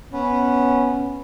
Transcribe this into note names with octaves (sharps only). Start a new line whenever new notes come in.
B3 C#4